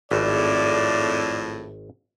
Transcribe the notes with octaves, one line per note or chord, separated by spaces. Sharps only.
G#1 F2 A2 D5